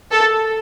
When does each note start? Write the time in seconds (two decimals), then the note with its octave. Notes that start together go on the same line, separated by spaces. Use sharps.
0.12 A4